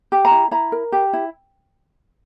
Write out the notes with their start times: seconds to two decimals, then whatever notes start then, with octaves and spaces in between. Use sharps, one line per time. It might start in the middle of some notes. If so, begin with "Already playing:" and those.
0.12 G4
0.25 A#5
0.31 E4
0.51 E4 A#5
0.72 A#4
0.92 G4
1.13 E4